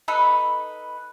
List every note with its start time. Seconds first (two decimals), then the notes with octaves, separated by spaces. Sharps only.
0.08 D#4 A4 B4 B5